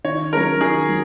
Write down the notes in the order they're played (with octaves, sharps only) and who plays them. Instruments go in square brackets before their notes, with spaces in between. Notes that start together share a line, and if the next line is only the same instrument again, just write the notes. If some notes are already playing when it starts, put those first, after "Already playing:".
[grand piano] D#3 [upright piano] C#5
[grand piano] F#3 C#4 G#4 [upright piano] A#4
[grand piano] D#3 [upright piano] G#4
[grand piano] F#3